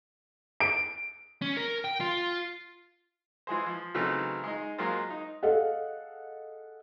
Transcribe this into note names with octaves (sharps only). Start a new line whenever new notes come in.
D7
C#4
A#4
G5
F4
E3 G#3 G#4 C5
F3
C#3 E3 F#3 A3 C4 D#4
G#3 D#4
F#3 G#3 A#3 F4 C5
D#4
G#4 A4 D#5 F5 F#5